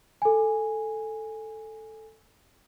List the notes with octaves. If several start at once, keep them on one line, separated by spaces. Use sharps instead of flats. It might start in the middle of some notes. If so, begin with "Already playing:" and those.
A4 G#5